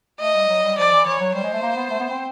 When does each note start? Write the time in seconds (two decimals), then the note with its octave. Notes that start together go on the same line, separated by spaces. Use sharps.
0.20 A3 D#5
0.35 G3
0.49 F#3
0.63 G3
0.78 F3 D5
0.92 E3
1.06 E3 C#5
1.20 F#3
1.35 G3 C5
1.44 G#3
1.54 A3
1.63 A#3
1.76 B3
1.91 A3
2.00 B3
2.10 C4